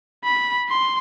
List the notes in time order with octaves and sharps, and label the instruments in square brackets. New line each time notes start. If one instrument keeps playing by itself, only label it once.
[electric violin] B5
C6